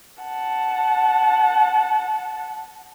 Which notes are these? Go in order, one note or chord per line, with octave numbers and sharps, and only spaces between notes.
F#5 A5